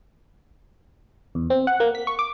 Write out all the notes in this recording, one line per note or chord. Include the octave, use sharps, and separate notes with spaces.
E2
C4
F#5
A#3
B6
C#6
D6